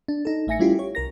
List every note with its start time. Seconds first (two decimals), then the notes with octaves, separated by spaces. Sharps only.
0.08 D4
0.25 D#4 A4
0.47 A1 A3 E5 G#5 A#6 C#7
0.59 G3 A3 C#4 E4 F4 G4
0.75 G4 C#5
0.95 C2 A#4 A#6